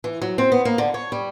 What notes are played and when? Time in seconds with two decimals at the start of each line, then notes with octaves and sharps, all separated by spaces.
0.04 E3
0.22 F#3
0.38 C4
0.52 B3
0.65 A#3
0.78 D3
0.94 C#5
1.12 G3